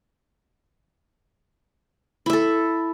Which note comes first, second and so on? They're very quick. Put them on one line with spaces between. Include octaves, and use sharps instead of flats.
E4 E5 A4